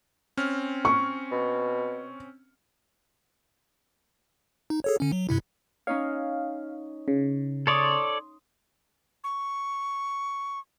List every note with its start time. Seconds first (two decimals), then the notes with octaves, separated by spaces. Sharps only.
0.37 C4 C#4 F6
0.85 C#6
1.32 B2
4.70 D#4
4.84 G#4 A4 C#5
5.00 D3 C#4
5.12 F#3
5.29 G2 C3 E4
5.87 C#4 D#4 C#5 F5
7.08 C#3
7.67 A4 C#5 D5 C6 D#6
9.24 C#6